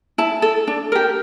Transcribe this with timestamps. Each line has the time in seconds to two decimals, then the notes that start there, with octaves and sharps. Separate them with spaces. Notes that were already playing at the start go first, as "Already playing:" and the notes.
0.18 E4 A5
0.42 A4
0.67 D4
0.92 G4 A#4